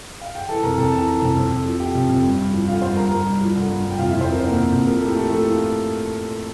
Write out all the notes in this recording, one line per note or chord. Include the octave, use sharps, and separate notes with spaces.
F5
G5
E3 A4 A5
F2 A#4 A#5
F2 A4 A5
E3 A5
E3 A#5
F2 A4 A5
F2
F2
F3
C3 G4 G5
F2
F2
G2
G2
F3
D3 F4 F5
G2 C5 C6
G2 A#4 A#5
G2 A#4 A#5
G2
F3
D3
G2
G2
G5
F2 F4 F5
E4 E5
F2
C4 C5
F3 A#4
D3 C5
A#3 A#4
F2
F2
F3 A#4
A2 A4
G4
A2 A3 A4
F3 A3 A4
F3
F4